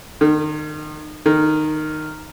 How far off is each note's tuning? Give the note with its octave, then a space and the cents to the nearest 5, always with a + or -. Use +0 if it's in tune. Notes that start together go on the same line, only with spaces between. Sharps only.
D#3 -35
D#3 -10